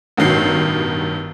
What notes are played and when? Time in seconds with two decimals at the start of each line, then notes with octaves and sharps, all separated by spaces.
0.17 A1 G2 B2 D#3 F#3 C7